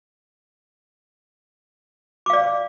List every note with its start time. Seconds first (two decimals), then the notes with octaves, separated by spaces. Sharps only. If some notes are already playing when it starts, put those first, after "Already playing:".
2.26 D6
2.30 F5
2.33 D5